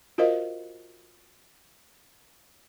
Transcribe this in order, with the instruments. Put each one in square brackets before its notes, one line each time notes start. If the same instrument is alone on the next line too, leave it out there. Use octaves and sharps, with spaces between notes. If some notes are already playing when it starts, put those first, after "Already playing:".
[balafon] F4 F#4 A#4 C5 D#5 F5